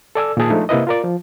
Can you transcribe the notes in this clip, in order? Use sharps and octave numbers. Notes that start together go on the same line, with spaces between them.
A4 D5 G#5 E6
A#2 D#3 G#4 A5
F3 G#3 A3 D4 D#4
C3 A#3 E4 B4 D#5
F4 A#4 D5
F3